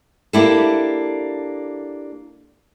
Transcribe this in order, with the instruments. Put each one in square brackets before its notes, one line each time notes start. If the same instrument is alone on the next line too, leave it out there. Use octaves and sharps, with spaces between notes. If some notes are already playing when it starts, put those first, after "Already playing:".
[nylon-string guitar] A#3 D4 E4 G4 A4